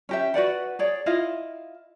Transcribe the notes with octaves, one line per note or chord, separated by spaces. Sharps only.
C#4 G4 E5
F#4 B4 D5 F#5
G#4 C#5 D5
E4 F4 D#5 F5